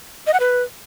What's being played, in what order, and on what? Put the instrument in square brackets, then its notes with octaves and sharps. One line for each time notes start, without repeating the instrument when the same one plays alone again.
[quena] D#5
F#5
B4